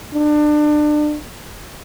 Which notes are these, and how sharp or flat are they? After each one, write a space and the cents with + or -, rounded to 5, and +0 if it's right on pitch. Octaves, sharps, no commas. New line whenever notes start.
D4 +30